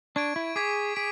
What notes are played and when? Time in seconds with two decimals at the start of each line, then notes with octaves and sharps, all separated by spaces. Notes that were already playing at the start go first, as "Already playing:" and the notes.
0.16 D4 C#6 G#6 D7
0.36 E4
0.56 G#4 D6 G#6 B6
0.96 G#4 B6 D7